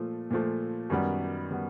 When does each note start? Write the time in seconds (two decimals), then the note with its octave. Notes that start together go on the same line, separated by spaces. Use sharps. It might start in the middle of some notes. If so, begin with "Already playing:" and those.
Already playing: A#2 F3 A3
0.30 A#2 F3 A3
0.90 F#2 D#3 G3 B3
1.51 D#3 G3 B3